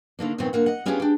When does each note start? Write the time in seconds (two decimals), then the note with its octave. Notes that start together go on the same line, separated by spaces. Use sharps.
0.19 D3 D#3 A#3 D4
0.38 F2 A#2 D#3 B3 C4 C#5
0.53 D3 A#3 F#5
0.66 D#5 F#5
0.86 B3 C#4 D4 F4 G4 G#4
1.00 D4 G4